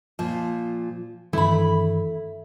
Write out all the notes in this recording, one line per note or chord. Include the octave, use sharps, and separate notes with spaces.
A#2 F3
G2 D#3 E3 A3 E4 B5